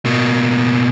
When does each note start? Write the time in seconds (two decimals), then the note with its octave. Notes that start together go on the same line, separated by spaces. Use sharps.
0.05 B2 A#3